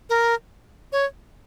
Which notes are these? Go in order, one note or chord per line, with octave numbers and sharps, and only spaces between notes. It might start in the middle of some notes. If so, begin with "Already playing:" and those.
A#4
C#5